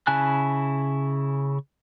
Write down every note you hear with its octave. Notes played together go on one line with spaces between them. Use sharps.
C#3 E4 G#5 A5 F#6